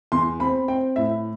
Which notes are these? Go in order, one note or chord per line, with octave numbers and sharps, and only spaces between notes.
E2 C6
C4 B5
C4 G5
A2 E5